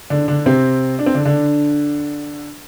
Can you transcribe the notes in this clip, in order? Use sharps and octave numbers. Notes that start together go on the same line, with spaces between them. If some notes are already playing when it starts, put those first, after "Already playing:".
D3 D4
D3 D4
C3 C4
D4
C4
D3 D4
D3 D4